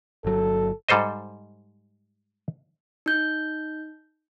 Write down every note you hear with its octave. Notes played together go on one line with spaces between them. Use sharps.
G1 F#3 A4
G#2 G3 A4 C5 D#5
D#4 G6